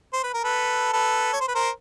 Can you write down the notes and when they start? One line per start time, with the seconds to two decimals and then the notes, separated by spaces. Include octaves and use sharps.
0.13 C5
0.23 B4
0.34 A#4
0.44 A4 B4
0.93 A4 B4
1.33 C#5
1.40 C5
1.48 B4
1.55 A#4 C5